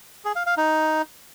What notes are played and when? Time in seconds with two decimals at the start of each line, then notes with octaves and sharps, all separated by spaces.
0.25 G#4
0.36 F5
0.46 F5
0.57 D#4